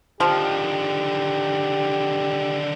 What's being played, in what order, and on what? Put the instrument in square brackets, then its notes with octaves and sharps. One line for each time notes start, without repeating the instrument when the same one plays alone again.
[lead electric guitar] D3 D#3 [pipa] F3 [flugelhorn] G4